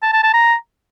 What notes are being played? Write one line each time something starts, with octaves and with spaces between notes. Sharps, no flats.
A5
A5
A5
A#5